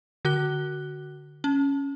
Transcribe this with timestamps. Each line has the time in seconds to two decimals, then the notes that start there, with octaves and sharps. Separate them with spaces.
0.25 D3 F#4 F#6 G7
1.44 C#4